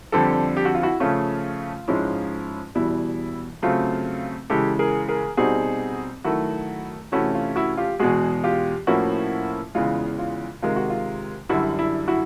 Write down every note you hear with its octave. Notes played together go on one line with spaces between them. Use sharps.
F2 D3 G3 C4 G4 A4
G4
F#4
F4
E4 F#4
C#3 F3 A3 C#4 F4
G#2 F3 G#3 C#4 E4
E2 B2 G3 E4
C#3 F#3 A3 C4 F4
C#3 E3 G#3 G4 A4
G#4 A#4
G#4 A#4
B2 G3 C4 D#4 F#4 G#4
D#3 F#3 A3 E4 F#4
C3 E3 A3 C#4 E4 F#4
F4
E4 F#4
F4 G4
E2 B2 G#3 F#4 G#4
F4 G4
A2 F3 A#3 C#4 E4 F#4
E2 C#3 E3 G#3 F4
F4
C3 D#3 G#3 F4
F#4
F4
F#2 D3 G3 E4 F#4
E4
E4 F#4